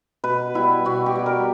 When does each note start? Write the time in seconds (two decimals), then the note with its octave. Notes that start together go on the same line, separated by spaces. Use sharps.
0.24 B2 B4
0.54 G3 B3 E4
0.85 B2 F#4
1.06 G4
1.15 G3 B3
1.26 A#4